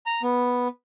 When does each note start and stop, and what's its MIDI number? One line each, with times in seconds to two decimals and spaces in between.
0.06 0.22 82
0.22 0.68 59